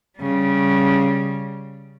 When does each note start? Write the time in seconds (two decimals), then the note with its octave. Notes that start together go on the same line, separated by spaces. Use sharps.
0.19 C#3 G3